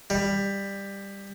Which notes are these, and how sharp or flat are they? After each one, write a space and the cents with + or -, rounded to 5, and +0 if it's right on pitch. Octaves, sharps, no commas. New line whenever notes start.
G3 +15